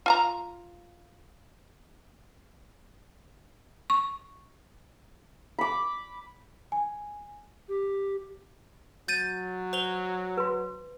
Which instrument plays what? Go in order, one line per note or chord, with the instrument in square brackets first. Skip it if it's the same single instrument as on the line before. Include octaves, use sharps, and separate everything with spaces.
[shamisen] F4 A5 A#5
[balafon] C#6
[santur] B5 D6
[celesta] G#5
[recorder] G4
[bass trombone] F#3 [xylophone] G6 A6 D#7
[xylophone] C5 F7 G7
[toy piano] B4 C6